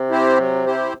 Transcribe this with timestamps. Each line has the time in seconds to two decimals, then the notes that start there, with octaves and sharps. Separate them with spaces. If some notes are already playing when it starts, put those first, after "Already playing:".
Already playing: C3
0.10 C4 E4 G4 C5
0.37 F#3
0.66 C4 E4 G4 C5